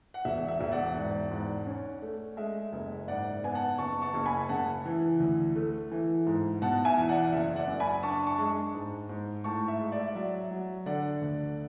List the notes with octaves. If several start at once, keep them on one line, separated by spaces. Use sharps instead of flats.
F#5
E1 E5
E5
E1 E5
D5 F#5
G#2
G#2
C#4
A3
G#3 E5
F#1
G#2 D5 F#5
B3 G#5
F#5 A5
F#1 A5 C#6
A5 C#6
F#1
G#5 B5
C#3 F#5 A5
E3
D2
A3
E3
G#2
B2 F#5 A5
E5 G#5
E2
D5 F#5
F#1 E5
D5 F#5
F#2
G#5 B5
D4 A5 C#6
A5 C#6
G#3
G#2
G#2
A2 A5 C#6
E5
G#3
D5
E5
D5
F#3 E5
F#3
D3 D5 F#5
D2